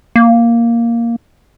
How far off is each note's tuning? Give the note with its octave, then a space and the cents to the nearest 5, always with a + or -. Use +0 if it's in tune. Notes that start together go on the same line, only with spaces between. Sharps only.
A#3 +0